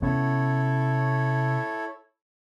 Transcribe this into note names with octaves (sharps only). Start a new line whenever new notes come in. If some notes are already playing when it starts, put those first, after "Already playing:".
C3 B3 C#4 E4 A4 C#5